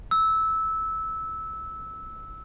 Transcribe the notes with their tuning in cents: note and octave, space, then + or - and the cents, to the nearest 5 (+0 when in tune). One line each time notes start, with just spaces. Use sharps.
E6 -15